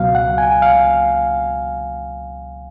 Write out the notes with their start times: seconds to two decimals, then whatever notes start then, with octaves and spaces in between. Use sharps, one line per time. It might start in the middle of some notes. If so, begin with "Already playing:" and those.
Already playing: C#2 B2 F#3 F5
0.15 F#5
0.38 G#5
0.62 F5